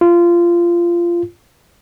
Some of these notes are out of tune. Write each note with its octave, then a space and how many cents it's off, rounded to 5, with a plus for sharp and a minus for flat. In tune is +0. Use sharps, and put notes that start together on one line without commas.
F4 -20